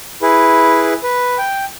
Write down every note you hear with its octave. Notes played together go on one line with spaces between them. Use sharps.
E4 G#4 B4
B4
G5